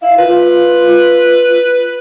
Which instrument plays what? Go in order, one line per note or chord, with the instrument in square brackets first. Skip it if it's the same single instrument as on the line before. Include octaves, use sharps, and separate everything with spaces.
[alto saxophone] E4 [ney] F5
[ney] F4 [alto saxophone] B4